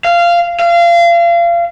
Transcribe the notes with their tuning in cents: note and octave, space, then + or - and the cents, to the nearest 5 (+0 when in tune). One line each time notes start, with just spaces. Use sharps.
F5 -15
F5 -30